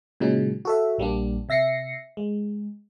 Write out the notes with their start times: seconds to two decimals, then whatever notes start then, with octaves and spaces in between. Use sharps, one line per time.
0.20 A#2 C#3 F#3 G#3 D#4
0.65 F#4 A4 E5
0.98 A#1 G3 A#3 D4
1.49 C3 E5 A#6 C7 C#7
2.17 G#3